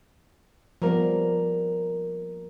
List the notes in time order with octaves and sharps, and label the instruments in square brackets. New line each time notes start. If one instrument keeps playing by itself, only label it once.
[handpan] F3 G3 B3 [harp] A#3 A#4